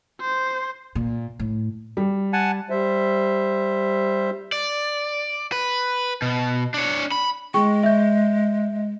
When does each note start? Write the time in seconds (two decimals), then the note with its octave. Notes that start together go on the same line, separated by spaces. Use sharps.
0.21 C5
0.95 A#2
1.39 A2
1.97 G3
2.33 F#5 G#5 A5
2.70 G3 C5 E5
4.52 D5
5.52 B4
6.22 B2
6.74 D4 C#5
7.12 B5
7.54 G#3 G#4 G5 C#6
7.83 E5 G6